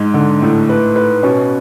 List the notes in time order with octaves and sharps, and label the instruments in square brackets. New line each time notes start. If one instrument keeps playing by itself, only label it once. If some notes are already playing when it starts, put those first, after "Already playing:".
Already playing: [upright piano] G#2 [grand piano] G#3
[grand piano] D3
[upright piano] A2 [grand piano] A3
[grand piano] B4
B4
[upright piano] B2 [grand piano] C#4